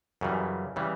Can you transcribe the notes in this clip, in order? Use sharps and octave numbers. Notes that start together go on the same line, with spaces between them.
F#2 C#3 E3 G3
C#3 E3 G3